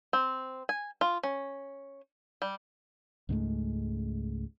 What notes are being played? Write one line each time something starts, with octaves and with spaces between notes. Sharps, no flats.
C4
G#5
F4
C#4
G3
C#2 G#2 G#3 A3